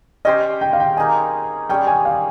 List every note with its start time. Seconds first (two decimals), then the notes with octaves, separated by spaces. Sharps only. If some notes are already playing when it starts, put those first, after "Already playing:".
0.25 C#4 G4 C5 D#5
0.61 G5
0.73 F5
0.80 G5
0.97 A#3 D#4 G#4 G#5
1.69 G3 C#4 G#4 C#5 G5
1.87 G#5
2.05 F5